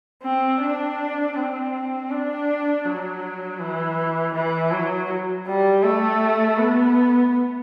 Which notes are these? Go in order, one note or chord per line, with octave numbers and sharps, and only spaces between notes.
C4
D4
C4
D4
F#3
E3
E3
F#3
G3
A3
B3